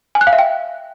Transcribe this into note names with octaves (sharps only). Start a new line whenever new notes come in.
G#5
F#6
F5
E5
G5